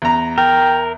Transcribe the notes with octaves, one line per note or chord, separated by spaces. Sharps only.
E2 A#5
A#4 G5